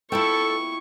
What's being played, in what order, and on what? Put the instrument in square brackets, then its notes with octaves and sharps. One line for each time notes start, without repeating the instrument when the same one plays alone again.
[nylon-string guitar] E4 F4 G5 [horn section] A4 [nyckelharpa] C#6